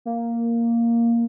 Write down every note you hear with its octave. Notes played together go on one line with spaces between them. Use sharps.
A#3